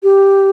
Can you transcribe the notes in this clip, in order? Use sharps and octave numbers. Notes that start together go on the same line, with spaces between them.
G4